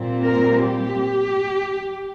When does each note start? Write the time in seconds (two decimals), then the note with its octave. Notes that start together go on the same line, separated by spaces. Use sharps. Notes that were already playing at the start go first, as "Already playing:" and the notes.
Already playing: A#2 G3 C4
0.24 A#4
0.64 G4